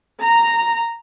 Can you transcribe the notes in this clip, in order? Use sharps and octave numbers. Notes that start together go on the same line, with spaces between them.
A#5